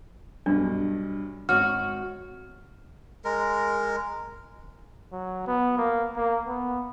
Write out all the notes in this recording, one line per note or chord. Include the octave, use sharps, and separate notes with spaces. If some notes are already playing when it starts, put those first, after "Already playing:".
B1 G2 D4
G#1 F#4 C#5 F6
G#3 A#4
F#3
B3
A#3
A#3
B3